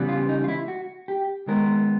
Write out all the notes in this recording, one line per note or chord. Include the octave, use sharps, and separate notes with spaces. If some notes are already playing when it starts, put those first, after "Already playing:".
Already playing: C#3 E3 G3 B3
F4
D#4
F4
E4
F#4
G4
D#3 G#3 B3 A#4